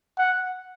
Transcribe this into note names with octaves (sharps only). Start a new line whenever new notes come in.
F#5